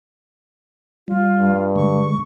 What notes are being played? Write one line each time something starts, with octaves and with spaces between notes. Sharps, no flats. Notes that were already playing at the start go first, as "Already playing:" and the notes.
G3 F4
G2
D3 G#3 C#6